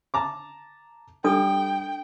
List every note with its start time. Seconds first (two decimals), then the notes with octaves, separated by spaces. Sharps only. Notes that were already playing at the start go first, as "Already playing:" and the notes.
0.14 A5 A#5 D6
1.24 G3 D4 A4 G5 D#6